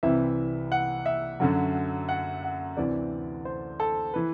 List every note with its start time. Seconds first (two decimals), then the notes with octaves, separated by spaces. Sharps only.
0.03 C2 C3 E3 E5
0.72 F#5
1.06 E5
1.40 F#2 D3 F#3
2.09 F#5
2.43 F#5
2.77 D2 C3 E3 D5
3.45 C5
3.80 A4
4.14 E3 B4